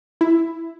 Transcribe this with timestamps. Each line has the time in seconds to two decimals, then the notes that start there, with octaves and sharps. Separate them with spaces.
0.21 E4